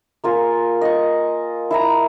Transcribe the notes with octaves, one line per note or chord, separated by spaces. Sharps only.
A#3 F4 G#4
D#5 C#6
E4 E5 A#5